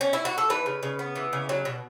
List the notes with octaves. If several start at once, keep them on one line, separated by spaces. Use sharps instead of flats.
C#4
E4
F#4
A4
E3 B4
C#3
C#3
B3
E3
C#3
F#3
B2